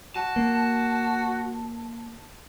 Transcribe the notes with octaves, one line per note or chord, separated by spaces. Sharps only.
F#4 A5
A#3